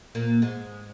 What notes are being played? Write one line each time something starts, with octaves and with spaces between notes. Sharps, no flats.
A#2 A#3
G#2 G#3